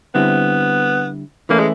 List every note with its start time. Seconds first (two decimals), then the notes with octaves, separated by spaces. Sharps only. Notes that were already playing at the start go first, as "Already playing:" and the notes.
0.15 D3 G3 B3 C4 E4
1.49 E3 A3 A#3 C#4 E4
1.59 G#3